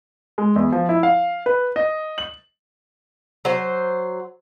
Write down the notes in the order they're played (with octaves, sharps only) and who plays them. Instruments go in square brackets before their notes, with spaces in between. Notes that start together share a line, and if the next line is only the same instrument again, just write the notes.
[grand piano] G#3
E2
F3
E4
F5
B4
D#5
F#7
[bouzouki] F#3 C5